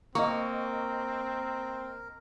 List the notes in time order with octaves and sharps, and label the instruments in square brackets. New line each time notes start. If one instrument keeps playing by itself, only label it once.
[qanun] A#3 [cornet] C4 [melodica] A#4 [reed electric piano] D#5 C#6